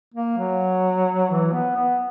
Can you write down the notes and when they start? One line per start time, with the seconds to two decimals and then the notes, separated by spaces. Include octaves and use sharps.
0.14 A#3
0.37 F#3
1.30 E3
1.53 B3
1.76 B3